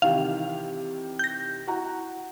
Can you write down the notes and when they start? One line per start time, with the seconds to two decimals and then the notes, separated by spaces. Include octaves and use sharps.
0.02 C3 D#3 E3 F5
1.19 G6 A#6
1.67 E4 F#4 A#5